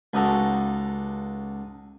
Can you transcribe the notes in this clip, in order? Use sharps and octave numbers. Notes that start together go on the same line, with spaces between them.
C#2 D#4 F#4 A4 A#5